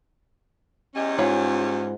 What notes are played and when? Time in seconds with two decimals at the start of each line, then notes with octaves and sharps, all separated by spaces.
0.95 E2 G3 C#4 D#5
1.19 G#2 D#4 F4 C#5 F5